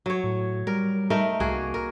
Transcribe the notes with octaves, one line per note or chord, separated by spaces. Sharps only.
F#3 C#5
A2
G3 A#4
A3 D#4 A#4
C2 A#3 F#4 G#4
A#4